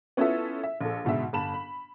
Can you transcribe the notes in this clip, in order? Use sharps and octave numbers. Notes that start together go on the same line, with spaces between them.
B3 C#4 E4 F4 A4 E5
E5
A#1 A4
G#2 B2 D3 E5
G1 A5 B5 E7
B5